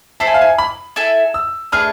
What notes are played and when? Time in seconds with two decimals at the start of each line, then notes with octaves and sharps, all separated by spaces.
0.20 E4 A4 C5 A5
0.27 G#5
0.34 F5
0.41 G#5
0.58 B5
0.96 E4 A4 E5 G#5
1.34 E6
1.72 A3 D4 G#4 B4 F6